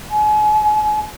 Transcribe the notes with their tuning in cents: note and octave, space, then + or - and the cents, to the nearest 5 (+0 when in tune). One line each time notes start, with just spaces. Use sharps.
G#5 +40